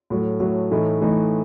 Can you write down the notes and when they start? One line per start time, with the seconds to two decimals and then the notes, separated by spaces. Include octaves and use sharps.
0.10 A2 F#3 A3
0.40 A2 F#3 A3
0.71 A2 E3 A3 D#4
1.01 A2 E3 A3 D#4